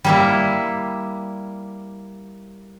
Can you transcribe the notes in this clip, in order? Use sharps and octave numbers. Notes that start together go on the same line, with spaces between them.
G3 A#3 E4